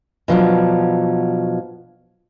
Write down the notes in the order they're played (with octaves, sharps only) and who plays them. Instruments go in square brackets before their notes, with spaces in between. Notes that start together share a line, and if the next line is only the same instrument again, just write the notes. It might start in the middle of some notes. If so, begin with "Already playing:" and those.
[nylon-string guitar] B2 F3 F#3 D4